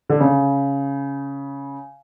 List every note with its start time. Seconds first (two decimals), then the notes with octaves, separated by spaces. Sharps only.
0.09 D3
0.20 C#3